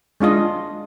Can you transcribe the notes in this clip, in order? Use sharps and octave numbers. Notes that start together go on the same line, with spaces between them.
G#3 D4 F4 D#5